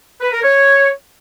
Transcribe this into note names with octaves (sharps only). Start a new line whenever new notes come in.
B4
A#4
C#5